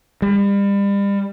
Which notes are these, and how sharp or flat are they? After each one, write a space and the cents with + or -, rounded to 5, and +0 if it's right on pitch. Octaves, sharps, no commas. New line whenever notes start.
G3 +35